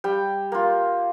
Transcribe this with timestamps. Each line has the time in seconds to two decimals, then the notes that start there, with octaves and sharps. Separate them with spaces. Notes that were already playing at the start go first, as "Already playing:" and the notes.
0.04 G3 G5
0.52 A#3 F4